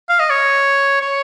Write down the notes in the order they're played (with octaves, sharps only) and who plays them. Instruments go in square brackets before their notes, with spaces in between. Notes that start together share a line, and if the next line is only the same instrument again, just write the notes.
[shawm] F5
D#5
C#5
C#5